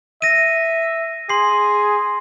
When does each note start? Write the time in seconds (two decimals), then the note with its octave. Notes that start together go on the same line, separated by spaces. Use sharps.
0.22 E5 A#6 D#7
1.30 G#4 C6 C7